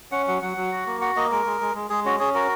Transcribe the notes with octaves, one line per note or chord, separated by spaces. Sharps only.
C#4 F#5
F#3 F#5
F#3 F#5
F#3
F#4
A#3
F#4 F#5
A#3 D#5
G#3 A#4
G#3
G#3
G#3
G#3 G#4
C#4 F#4
C#4 G#4
F#4 A#4